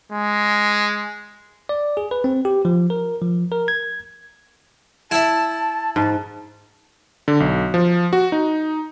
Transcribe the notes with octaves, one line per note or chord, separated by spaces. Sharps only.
G#3
D5
G#4
B4
C4
G4
F3
A#4
F3
A#4
G#6
E4 E5 A5
G#2 A5
D3
B1
F3
F#4
D#4